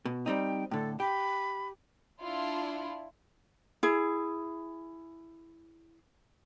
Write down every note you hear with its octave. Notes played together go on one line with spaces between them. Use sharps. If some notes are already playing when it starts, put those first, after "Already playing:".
B2
G3 C4 D#4 G5
A2 D3 A4
G4 B5
D4 E4 F4
E4 G#4